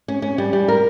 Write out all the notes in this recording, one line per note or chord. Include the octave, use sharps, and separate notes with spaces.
C#4
C#4
G3
G3
A#4